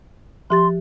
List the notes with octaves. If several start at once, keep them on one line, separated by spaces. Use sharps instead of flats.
F3 G4 C6 A6